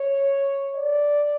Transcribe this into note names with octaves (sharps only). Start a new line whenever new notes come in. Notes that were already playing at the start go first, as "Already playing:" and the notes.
Already playing: C#5
D5